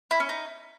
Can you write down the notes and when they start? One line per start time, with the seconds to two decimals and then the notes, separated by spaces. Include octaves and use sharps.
0.11 E4
0.20 C#4
0.29 D#4